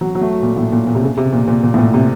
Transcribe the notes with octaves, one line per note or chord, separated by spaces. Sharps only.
F#3
F#3
A3
A#2
A2
A#2
A#2
C3
C#3
C3
A#2
A#2
A#2
A2
A#2
C3